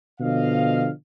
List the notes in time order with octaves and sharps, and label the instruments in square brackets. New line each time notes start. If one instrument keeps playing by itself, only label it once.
[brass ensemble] B2 D3 F3 D#5 F5